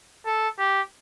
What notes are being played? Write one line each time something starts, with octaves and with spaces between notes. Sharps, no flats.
A4
G4